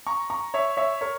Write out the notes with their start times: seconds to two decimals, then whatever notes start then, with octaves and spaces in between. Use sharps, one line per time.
0.07 A#5 C#6
0.30 A#5 C#6
0.54 C#5 E5
0.77 C#5 E5
1.01 A#4 C#5